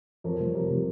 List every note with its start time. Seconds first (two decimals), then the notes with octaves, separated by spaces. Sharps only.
0.24 F2 A#4 C#5
0.40 C3 G3
0.55 F2 G4 A#4
0.70 C3 G3